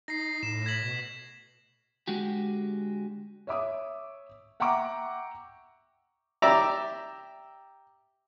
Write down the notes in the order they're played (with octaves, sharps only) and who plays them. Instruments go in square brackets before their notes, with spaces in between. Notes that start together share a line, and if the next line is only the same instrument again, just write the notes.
[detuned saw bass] D#4 [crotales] A#6 C7
[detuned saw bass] A2 [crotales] E7
[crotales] G#6 B6 F#7
[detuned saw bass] B2
[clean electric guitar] D3 G#3 F#4 G4
[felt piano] C#5 E5 D6 D#6
E5 F#5 G5 A#5 C#6 D6
[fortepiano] G4 D5 E5 A#5